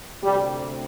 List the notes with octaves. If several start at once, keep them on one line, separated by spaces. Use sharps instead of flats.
D2 C3 G3